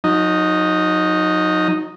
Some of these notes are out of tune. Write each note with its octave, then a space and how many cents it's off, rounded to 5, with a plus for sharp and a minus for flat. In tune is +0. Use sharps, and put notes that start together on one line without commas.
F#3 -35 D#4 +0